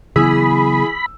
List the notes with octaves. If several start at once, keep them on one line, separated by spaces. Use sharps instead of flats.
C#3 E3 F#3 B3 G#4 B5 D#6 E6